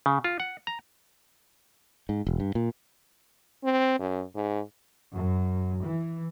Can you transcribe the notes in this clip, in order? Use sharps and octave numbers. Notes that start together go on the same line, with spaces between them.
C#3
F4
F#5
A#5
G#2
E1
G2
A#2
C4
F#2
G#2
F#2
E3